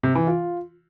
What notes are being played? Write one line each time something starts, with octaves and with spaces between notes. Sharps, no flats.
C3
E3
F4